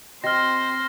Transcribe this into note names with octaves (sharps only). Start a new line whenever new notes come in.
C4 F#4 C5 D#5 G5 F6 A#6